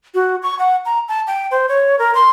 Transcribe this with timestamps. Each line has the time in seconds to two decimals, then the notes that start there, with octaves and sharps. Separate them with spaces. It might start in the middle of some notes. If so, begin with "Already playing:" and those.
0.15 F#4
0.43 C#6
0.59 F#5
0.85 A#5
1.08 A5
1.27 G5
1.51 C5
1.69 C#5
1.99 A#4
2.15 C6